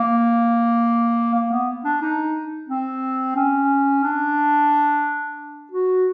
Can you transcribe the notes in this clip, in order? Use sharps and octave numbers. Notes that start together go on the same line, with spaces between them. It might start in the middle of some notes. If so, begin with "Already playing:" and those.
Already playing: A#3
A#3
B3
D4
D#4
C4
C#4
D4
F#4